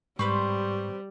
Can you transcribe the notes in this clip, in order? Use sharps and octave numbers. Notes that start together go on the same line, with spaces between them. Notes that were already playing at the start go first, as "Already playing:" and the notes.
G#2 G3 C4 B4 C5 C#6